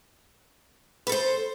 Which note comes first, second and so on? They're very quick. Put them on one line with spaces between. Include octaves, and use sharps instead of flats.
B4 A4 C5